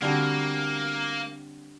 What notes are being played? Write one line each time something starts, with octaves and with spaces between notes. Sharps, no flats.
D3 G3 A#3 C4 F#4